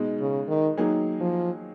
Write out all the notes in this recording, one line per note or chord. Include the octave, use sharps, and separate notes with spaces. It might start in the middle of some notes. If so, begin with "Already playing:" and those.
Already playing: B2 G#3 D#4
C#3
D#3
D#3 F#3 A#3 D#4 G#4
F3